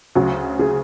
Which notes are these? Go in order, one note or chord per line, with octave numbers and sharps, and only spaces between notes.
D2 C#3 F#3 F#4
G#4